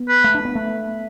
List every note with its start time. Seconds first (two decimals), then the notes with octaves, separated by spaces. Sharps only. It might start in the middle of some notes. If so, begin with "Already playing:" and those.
Already playing: B3
0.09 B4
0.24 A3
0.34 D4
0.45 B3
0.55 A3